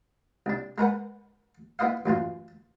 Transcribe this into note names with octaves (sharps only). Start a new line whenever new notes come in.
C2 D4
G#3 A#4 B4 F#5
B3 E4 B4 D#5 F5
A1 F#2 E3 F4